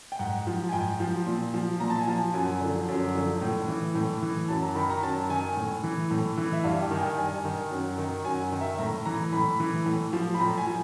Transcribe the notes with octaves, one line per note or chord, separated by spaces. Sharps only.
G5
G#2 F#5
F3
G#5
G#2 G5
F3
A#2
F3
A#2 A#5
A5
G#5
F3 A5
F#2 G#5
D3 F3
F#2
D3 F3
A2
E3
A2
E3
F#2 A5
A#5
D#3 B5
A#5
F#2 A5
D#3 G#5
A2
E3
A2
E3
E5
G2 F5
G5
D#3
G#5
G5
G2 G#5
D#3
F#2
D#3
F#2 G#5
D#3
E5
A2 A#5
E3 A#5
A2 B5
E3
A2
F3
B5
A2 A#5
G#5
F3